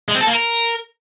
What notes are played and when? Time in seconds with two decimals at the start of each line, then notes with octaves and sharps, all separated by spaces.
0.08 G#3
0.15 C4
0.21 A4
0.27 A#3
0.33 A#4